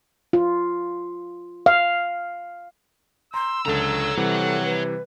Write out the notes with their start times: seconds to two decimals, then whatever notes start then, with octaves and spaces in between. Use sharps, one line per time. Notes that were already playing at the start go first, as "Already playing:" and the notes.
0.33 F4
1.66 F5
3.34 A#5 C6 E6
3.66 C#2 D3 A4 C#5 A#5
4.17 C3 E3 G3 F#5
4.64 B4